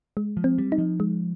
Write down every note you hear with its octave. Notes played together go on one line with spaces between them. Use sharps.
G#3
F3
C4
G3
D#4
F3
G#3